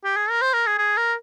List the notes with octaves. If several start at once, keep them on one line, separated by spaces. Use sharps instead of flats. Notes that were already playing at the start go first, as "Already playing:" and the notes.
G4
G#4
A#4
C5
A#4
G#4
G#4
A#4